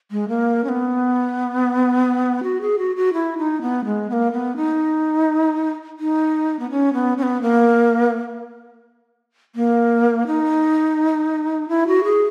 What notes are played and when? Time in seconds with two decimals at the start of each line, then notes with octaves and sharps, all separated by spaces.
0.11 G#3
0.28 A#3
0.64 C#4
0.69 B3
2.43 F#4
2.61 G#4
2.79 F#4
2.96 F#4
3.13 E4
3.38 D#4
3.62 B3
3.85 G#3
4.10 B3
4.13 A#3
4.32 B3
4.56 D#4
6.00 D#4
6.59 B3
6.71 C#4
6.93 B3
7.18 C#4
7.23 B3
7.42 A#3
9.55 A#3
10.27 D#4
11.69 E4
11.87 F#4
12.04 G#4